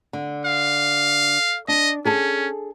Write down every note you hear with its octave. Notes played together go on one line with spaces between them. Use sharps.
D3
F5
D4 D#5
C#4 G#4 A4 A5